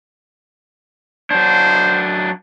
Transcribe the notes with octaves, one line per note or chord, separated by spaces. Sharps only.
F#3 D4 C5